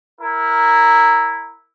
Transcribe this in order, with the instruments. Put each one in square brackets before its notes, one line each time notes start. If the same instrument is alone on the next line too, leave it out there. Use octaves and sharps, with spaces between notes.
[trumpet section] E4 A#4